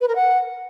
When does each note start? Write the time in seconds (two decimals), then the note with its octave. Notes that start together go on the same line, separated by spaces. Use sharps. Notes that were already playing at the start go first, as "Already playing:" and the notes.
0.01 B4
0.08 A#4
0.15 F#5